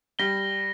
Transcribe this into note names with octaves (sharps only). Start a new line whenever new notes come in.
G3 A#6 G7